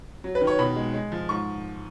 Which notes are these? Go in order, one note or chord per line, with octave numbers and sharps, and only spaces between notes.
F#3
B4
D#3
C#5
B2 B5
G#3
G#3
F3
G#2 C#6